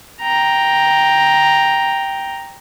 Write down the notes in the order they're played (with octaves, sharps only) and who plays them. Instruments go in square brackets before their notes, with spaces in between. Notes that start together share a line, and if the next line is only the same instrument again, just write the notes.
[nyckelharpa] G5 A#5